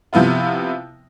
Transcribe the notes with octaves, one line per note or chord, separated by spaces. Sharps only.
C3 F3 B3 E4 F4